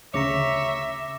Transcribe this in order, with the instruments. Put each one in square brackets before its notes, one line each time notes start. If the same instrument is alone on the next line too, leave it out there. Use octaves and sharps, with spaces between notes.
[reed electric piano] D2 C#3 A#5 [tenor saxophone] C#5 [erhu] E5 [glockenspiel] D6 A#6 C#7